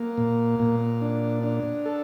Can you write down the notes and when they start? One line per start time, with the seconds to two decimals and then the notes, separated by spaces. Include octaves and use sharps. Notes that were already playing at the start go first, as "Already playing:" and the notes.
Already playing: A#3
0.17 A#2
0.60 A#2
1.02 D4
1.43 D4
1.85 A4